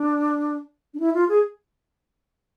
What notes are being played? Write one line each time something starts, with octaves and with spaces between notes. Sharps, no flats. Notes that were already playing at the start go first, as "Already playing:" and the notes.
Already playing: D4
D4
E4
F4
G#4